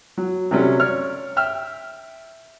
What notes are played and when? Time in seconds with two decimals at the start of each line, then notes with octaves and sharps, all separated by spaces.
0.17 F#3
0.51 C3 F#3 G3 A3 C#4
0.80 C#5 D5 F6
1.37 E5 G5 E6 F6